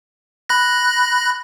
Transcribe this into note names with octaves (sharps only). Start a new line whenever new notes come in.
B5 F#6 A#6